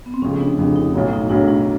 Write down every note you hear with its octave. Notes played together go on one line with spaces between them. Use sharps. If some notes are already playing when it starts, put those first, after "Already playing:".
B3
C4
F1 F2 C#3 C#4
D4
F1 F2 C#3 D4
D#4
B1 A2 F#3
D#4
B1 A2 F#3 D4
D4